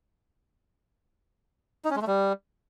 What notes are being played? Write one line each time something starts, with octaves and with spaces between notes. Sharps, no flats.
D#4
C#4
G#3
A3
G3